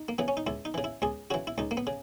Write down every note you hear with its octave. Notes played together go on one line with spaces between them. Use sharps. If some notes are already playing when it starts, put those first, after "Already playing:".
Already playing: D#4
A#3
C#3 E3 B3
C#4
D#4
C#2 E4
D#4
C#3 E3
E4
C#2 G#4
C#3 E3 F#4
E4
C#2 D#4
A#3
B3
C#3